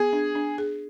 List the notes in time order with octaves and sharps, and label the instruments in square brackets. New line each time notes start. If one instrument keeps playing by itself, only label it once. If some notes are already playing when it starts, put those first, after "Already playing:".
Already playing: [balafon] B3 [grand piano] G#4
[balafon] D4
D4
G#4